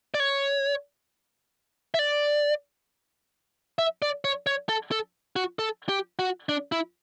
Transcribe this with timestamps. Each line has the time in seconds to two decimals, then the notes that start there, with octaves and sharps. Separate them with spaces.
0.14 D5
0.20 C#5
1.94 E5
1.99 D5
3.79 E5
4.02 D5
4.25 C#5
4.47 C#5
4.69 A4
4.91 A4
5.36 F#4
5.59 A4
5.89 G4
6.19 F#4
6.49 D4
6.72 E4